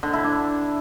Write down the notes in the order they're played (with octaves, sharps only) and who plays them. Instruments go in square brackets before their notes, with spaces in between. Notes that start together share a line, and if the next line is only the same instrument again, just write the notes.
[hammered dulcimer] D3
E4
D4